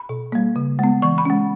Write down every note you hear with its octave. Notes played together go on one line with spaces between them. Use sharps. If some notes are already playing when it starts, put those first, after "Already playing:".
Already playing: B5
B2
G3 A#3
C#3
G#3 B3
E3 C#6
B5
G#3 C#4